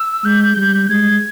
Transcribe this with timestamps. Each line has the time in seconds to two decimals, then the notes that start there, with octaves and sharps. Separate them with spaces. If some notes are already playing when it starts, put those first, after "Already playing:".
Already playing: E6
0.25 G#3 G6
0.57 G3
0.86 G6
0.89 G#3 G#6